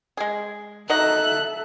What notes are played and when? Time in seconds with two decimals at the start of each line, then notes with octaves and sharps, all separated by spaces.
0.17 G#3 G#4
0.90 F#3 D#4 A4 D#5 E5 F#6